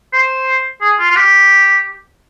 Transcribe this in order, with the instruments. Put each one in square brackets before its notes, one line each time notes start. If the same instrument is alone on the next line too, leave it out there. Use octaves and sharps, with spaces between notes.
[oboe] C5
G#4
F4
F4
G4